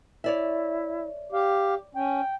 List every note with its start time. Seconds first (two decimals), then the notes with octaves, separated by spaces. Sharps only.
0.24 E4 C#5 D5 E5
1.32 G4 F5
1.95 C#4 G5